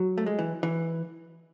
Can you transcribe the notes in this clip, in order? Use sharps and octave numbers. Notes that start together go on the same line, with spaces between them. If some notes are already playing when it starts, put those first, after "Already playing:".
Already playing: F#3
A3
G#3
E3
E3